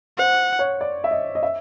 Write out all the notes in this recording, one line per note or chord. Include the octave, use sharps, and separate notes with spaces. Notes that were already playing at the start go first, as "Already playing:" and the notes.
C5 F#5
C#5
D5
E5
D#5
D#5
E5